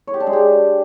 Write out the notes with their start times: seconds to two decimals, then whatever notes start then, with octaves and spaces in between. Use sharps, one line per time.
0.07 C#5
0.14 G4
0.20 D4
0.27 G#3
0.33 G4